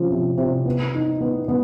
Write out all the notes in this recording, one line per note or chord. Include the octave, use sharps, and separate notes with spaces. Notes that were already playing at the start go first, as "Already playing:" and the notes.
Already playing: C3 F3 C#4
C3
C3
B3
D#4
B3
B3